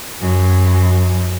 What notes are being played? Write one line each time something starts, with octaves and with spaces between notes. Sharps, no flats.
F#2